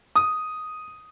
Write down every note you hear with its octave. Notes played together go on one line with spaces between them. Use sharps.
D#6